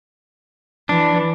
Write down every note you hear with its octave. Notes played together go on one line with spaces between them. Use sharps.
E3 D4